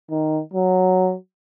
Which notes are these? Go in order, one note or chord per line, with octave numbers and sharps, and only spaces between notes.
D#3
F#3